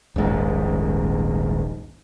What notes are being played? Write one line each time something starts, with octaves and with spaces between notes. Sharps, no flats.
D#1 A#1 G#2